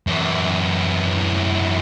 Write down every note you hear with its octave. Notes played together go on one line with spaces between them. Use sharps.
F#2 E3